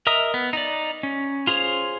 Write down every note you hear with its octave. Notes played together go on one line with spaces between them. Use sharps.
A#4 D#5 E5 A#5 D#6
B3
D#4 D5
C#4
F4 G#4 C5 C#5